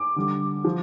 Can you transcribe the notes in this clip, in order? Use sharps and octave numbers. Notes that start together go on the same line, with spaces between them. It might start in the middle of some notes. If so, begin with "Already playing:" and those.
Already playing: D6
D3 G3
F3